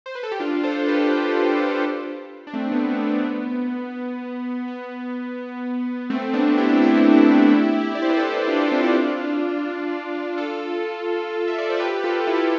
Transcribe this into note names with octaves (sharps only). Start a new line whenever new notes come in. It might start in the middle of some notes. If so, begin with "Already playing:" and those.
C5
B4
A4
G4
D4 F4
A4 C5
G4 B4
D4
A3 C4
B3
A3
B3
B3
A3 C4
B3 D4
E4 G4
E4 G4
D5
C5
B4
A4
E4 G4
D4 F4
C4 E4
G4
D4 F4
F4 A4
E5
D5
C5
G4 B4
F4 A4
E4 G4